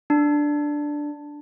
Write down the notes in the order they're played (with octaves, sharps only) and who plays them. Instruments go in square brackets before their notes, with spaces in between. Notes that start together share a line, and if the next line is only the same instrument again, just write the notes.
[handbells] D4